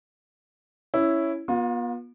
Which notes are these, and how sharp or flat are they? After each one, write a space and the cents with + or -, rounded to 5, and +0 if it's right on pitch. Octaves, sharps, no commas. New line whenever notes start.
C#4 +0 E4 +0
B3 -35 F4 +30